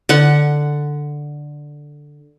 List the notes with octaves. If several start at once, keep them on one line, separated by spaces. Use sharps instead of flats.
D3 F#5